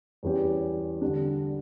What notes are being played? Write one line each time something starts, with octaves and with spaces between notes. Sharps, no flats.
E2 E3 G3 C#4 G4
D3 G3 D4